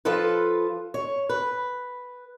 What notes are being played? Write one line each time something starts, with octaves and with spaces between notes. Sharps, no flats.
F3 F4 A4 B4
C#5
B4